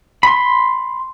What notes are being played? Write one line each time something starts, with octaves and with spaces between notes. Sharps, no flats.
B5 C6